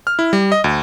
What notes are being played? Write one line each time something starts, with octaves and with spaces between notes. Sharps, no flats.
F6
E4
G3
D#5
D2